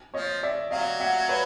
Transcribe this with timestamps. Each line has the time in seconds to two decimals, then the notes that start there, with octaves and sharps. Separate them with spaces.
0.14 F3 C#5 D#5
0.43 D5 E5
0.71 F#3 D#5 F5
1.00 E5 F#5
1.29 B4 C#5